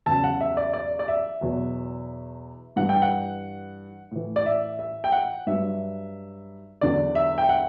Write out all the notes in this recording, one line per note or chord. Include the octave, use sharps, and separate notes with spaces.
E2 C#3 F#3 A5
F#5
E5
D5
D5
D5
E5
E2 B2 F#3
G2 E3 F#5
G5
F#5
A2 E3
D5
E5
E5
G5
F#5
G2 F#3 E5
E2 D3 F#3 D5
E5
G5
F#5